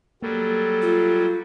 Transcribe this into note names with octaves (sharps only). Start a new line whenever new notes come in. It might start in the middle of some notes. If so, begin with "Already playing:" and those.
F#3 G3 A#3 A4
F4